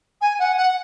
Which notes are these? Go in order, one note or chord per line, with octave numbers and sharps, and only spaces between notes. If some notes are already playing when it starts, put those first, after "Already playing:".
G#5
F#5
F#5